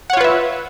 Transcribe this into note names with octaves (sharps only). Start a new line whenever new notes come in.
F4 B4 C#5 E5 F#5